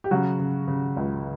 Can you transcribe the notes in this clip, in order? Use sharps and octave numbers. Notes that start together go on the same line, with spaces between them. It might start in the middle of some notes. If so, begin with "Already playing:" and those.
G4
C#3 F#3 F#4
C#3
C#3
C#2